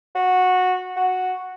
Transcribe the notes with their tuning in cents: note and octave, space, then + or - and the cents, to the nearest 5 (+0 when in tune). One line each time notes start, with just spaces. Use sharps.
F#4 -15
F#4 -5